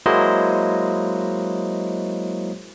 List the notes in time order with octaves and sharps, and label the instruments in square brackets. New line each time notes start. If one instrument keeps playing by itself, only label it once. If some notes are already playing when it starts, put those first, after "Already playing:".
[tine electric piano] F#3 G#3 A#3 E4 C5 D#5